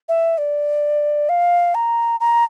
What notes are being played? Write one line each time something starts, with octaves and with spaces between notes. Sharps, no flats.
E5
D5
F5
A#5
A#5